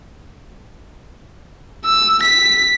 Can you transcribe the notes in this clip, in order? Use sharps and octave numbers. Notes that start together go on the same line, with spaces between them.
E6
B6